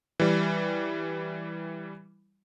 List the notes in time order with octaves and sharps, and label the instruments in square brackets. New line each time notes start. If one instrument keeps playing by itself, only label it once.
[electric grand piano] E3 G3